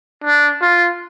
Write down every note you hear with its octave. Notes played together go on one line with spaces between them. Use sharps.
D4
F4